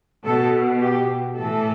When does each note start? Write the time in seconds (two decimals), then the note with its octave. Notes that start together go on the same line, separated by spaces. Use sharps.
0.25 B2 A4
0.81 G4
1.37 A2 E3 A4